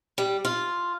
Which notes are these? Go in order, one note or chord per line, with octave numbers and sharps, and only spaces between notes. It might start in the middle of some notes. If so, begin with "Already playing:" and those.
G3
F4